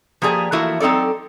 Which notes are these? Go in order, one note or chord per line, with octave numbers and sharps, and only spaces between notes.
F3 A#3 G4 G#4 D5
E3 F3 A3 A#3 E4 F#4
F#3 C4 D#4 A4 D5